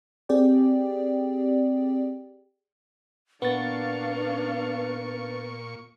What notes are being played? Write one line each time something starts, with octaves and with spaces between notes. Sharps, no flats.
C4 G4 G#4 D5 G5
A#2 B3 D4 B4 F5 C#6 A6